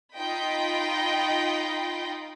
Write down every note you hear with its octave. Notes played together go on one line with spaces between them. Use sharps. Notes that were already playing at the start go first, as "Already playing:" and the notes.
D#4 F4 D#5 G5 B5